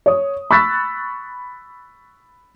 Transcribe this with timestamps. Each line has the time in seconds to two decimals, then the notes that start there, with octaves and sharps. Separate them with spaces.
0.06 C#5 D#6
0.51 B5 C#6 E6 F#6 A6 B6